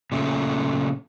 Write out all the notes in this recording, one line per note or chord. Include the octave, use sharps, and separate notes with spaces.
A#2 C#3 A3